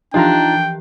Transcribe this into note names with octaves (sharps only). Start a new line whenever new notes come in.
E3 F3 D4 D#4 F4 G4 G5 A#5